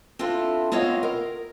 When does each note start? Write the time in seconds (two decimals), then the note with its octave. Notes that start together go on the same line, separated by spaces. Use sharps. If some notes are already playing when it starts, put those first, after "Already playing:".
0.19 C4 D4 E4 F4 A4
0.72 B3 C4 F4 C#5 D#5 F5
1.03 A#4